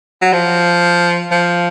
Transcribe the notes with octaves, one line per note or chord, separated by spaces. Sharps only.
F#3
F3
F3